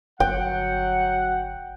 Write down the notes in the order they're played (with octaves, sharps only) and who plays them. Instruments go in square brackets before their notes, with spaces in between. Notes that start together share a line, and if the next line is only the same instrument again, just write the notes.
[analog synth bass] G1 [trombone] F#3 [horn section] F#5 [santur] G5